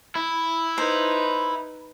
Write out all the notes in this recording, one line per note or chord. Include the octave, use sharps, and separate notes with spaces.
E4
D#4 B4 C5